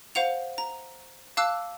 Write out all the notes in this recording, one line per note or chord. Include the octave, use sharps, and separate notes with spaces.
C5 F5 F#5 F7
A#5
F5 A5 D6 E6 F#6